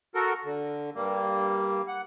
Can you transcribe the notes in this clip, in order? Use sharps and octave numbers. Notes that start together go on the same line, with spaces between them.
F#4 A4 A#4
D3
G2 G3 A#3
F#5